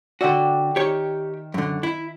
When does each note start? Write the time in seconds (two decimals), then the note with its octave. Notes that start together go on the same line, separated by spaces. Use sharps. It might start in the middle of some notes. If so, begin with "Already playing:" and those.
0.21 D3 F#4 D5 E5 G5
0.76 D#3 G4 C#5
1.54 F#2 D3
1.83 E4